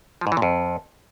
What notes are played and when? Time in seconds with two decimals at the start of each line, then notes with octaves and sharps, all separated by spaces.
0.21 F3
0.27 G#2
0.32 E3
0.37 A#2
0.42 F2